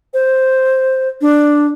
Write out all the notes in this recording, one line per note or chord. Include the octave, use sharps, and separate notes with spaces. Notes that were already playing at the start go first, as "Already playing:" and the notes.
C5
D4